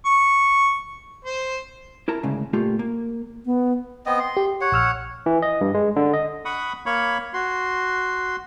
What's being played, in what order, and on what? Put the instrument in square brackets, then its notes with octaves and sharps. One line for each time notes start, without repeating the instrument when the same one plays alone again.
[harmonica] C#6
C5
[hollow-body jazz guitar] E4 A#4 A5 A#5
D2 G#2 C#3
A#2 A3 A#3 F4 G4
A#3
[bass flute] B3
[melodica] B3 C4 D#5
C6
[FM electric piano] G4
[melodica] C#5 F#5
[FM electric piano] A#1 E6 F6
[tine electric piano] E3
D#5
G2
G#3
D3
D#5
[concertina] F#5 B5 C#6 D#6
A#3 C#5 B5 C#6
F#4 C6